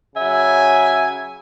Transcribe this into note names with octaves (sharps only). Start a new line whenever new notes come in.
C#3 F#3 E5 G#5